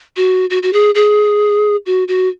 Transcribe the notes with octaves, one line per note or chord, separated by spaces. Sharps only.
F#4
F#4
F#4
G#4
G#4
F#4
F#4